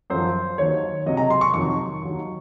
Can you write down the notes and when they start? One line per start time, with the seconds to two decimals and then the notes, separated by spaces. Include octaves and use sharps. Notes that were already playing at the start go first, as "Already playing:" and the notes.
0.10 F#2 F3 C5
0.58 D#2 D#3 F#3 C#5
1.06 C#2 C3 F#3 D#5
1.17 A#5
1.30 C6
1.41 C#6
1.53 F2 C3 D#3 F#3 C#6
2.01 D#2 D#3 F#3